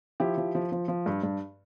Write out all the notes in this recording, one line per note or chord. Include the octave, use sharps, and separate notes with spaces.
F3 E4 G4
F3
F3
F3
F3
G2
G2